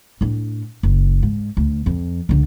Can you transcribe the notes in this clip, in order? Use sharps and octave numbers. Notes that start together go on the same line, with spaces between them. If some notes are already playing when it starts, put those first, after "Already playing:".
A2 D4
F#1
G#2
D2
F2
C#2 D3